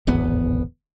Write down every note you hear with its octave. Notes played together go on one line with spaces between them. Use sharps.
D1 G#1 E2 B3